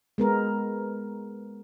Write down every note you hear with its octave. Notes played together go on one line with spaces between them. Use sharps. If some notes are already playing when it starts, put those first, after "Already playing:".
G#3 B3 A#4